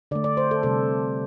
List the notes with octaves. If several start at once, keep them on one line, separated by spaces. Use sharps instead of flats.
D3 A3 D5
D5
C5
A4
C3 G3 A4